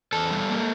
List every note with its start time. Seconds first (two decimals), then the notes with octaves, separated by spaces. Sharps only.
0.13 E2 A4 A5
0.31 G3
0.50 A#3